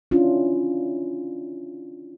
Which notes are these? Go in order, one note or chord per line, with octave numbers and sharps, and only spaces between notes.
C#4 D4 E4 F4